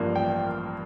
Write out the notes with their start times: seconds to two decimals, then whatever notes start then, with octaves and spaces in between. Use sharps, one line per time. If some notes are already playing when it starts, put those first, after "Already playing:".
Already playing: A1 G2 F3 A#3 D4
0.15 G5
0.44 A#4